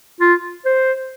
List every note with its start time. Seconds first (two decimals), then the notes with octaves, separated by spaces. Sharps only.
0.21 F4
0.65 C5